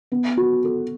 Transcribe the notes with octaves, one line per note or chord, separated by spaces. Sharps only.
B3
F#4
A4